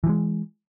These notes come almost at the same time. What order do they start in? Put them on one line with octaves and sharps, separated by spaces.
E3 F3 G#3